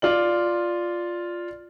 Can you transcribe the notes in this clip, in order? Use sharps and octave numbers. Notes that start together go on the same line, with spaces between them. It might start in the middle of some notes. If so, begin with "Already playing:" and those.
F4 D5 F#7